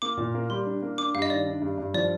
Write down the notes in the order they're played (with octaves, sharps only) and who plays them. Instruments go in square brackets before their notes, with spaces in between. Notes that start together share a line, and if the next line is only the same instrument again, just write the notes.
[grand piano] A#3 [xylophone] D6
[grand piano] A#2
A#3
[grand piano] G3 [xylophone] C6
[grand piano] D4
A#3
[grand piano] D4 [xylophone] D6
[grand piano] G2 [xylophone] F5
[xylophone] D#5
[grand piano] D#3 [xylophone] D5
[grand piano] D4
G2
G2
[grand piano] F3 [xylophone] D5